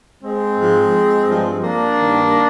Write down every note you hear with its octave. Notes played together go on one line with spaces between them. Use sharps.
G#3 C4
G#2 F3
G2 F3
A#3 D4
G2 D#3